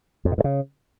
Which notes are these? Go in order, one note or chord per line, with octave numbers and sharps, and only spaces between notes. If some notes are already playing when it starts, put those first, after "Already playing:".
F2
B2
G2
C#3